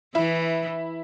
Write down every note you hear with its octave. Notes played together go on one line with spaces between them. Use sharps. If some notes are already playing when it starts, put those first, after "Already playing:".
E3 E4